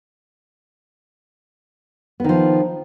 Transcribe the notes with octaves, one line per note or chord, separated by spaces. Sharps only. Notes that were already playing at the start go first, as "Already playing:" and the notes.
D#3 F3 B3